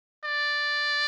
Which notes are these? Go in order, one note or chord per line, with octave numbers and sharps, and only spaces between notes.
D5